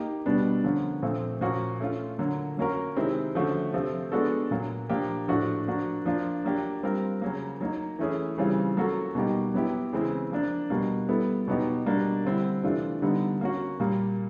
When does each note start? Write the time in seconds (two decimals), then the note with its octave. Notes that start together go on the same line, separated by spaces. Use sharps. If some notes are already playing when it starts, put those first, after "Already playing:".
Already playing: A#3 D#4 G4
0.26 B2 G3 B3 D4
0.64 D3 F3 A#3 C#4
1.02 A#2 F3 A3 C4
1.41 A#2 F3 A#3 C#4 F#4
1.80 A3 C#4 F4
2.19 D3 F#3 A#3
2.57 F#3 A#3 C#4 F#4 A#4
2.96 C3 D#3 G#3 C4 E4
3.35 D3 F3 A3 C#4 F#4
3.73 C3 F3 A3 C4 F4
4.12 G#3 B3 D4 F#4 A4
4.51 A#2 F#3 A#3
4.89 A#2 F3 A#3 D4 G4
5.28 A2 F3 A3 D4 F#4
5.67 F3 A#3 D4 F#4
6.06 F3 A#3 D4 F4
6.44 F#3 A#3 D4 G4
6.83 G3 C4 F4 A#4
7.22 C#3 F#3 A#3
7.61 F#3 A#3 D#4
7.99 E3 A3 C#4 E4 G#4
8.38 C#3 E3 G3 C4 F4
8.77 F#3 A#3 C#4 F#4 A4
9.15 B2 G3 A#3 D#4 G4
9.54 F#3 B3 E4 G4
9.93 C#3 E3 G#3 C4 E4
10.31 F3 A#3 D4
10.70 B2 G3 A#3
11.09 G3 B3 E4 A4
11.48 B2 F#3 B3 D#4 G4
11.86 B2 G3 A#3 D4
12.25 D3 G3 C4 E4
12.63 C3 E3 A3 D4 F4
13.02 D3 G3 B3 D#4
13.41 A#3 C#4 F#4
13.80 A#2 G3 A#3